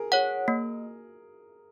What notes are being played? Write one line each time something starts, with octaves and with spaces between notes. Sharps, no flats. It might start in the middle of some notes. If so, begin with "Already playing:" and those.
Already playing: G#4 A#4
G#4 C#5 F#5
A#3